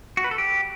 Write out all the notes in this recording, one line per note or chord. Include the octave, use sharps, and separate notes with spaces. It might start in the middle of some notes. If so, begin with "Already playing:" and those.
F#4
B4
A4
G4